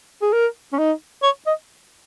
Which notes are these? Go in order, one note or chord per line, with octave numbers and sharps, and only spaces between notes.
G#4
A#4
C#4
D#4
C#5
D#5